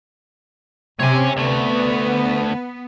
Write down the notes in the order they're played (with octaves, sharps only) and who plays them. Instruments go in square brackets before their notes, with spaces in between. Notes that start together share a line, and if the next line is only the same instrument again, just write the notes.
[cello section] C3 [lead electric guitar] C#5 G#5
[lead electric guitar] D2 A3 [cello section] B3